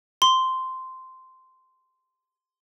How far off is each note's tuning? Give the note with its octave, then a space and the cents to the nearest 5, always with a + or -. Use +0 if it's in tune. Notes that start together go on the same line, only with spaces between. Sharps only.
C6 -10